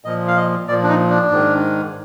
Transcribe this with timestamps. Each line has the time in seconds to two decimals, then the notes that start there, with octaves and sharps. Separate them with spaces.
0.05 A#2 F3 D#5
0.28 F5
0.36 D#5
0.68 A#2 F3 D5
0.84 D4
0.89 D#4
1.10 D4
1.31 G#2 D#3